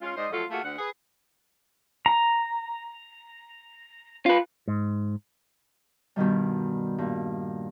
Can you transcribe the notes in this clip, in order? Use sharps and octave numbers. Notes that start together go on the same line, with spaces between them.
G#3 C#4 F4
G#2 C5 D5 D#5
F3 F#3 A3 F4 A4
A3 A#3 F4 F#4 G#4
D2 D3 F#5
G#4 B4
A#5
F4 B4
G#2
G2 B2 D#3 G3
G2 A#2